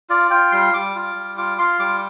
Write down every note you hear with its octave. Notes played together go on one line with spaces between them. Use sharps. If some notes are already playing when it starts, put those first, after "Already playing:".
F4 D5
F4 G5
G3 C6
G3 D6
F4
G3
F4 D6
F4 C6
G3 D6